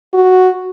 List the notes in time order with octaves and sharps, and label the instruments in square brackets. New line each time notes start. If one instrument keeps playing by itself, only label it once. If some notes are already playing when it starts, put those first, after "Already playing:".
[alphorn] F#4